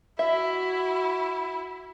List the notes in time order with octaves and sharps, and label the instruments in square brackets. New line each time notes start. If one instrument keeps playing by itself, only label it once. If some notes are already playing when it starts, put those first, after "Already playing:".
[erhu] E4 [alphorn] F#4 [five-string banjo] E5